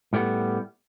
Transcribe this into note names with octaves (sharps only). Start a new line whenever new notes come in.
A2 G3 A3 B3